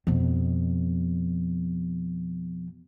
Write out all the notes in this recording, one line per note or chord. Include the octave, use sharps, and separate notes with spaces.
F2 B2